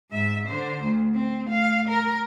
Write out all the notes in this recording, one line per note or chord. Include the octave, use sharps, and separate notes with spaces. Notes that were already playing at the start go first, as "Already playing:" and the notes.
G#2 E5
D3 C5
D2
C4
A3 F5
A#4